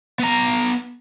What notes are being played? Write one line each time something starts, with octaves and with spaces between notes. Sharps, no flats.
B3 A#5